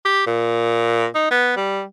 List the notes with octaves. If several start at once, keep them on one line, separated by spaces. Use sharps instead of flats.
G4
A#2
D#4
B3
G3